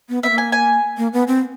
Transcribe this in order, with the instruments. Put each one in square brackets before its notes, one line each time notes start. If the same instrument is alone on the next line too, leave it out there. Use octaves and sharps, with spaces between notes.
[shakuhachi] B3
[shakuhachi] B3 [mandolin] E5
[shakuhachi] A#3
[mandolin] G#5
G#5
[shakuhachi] A#3
B3
C4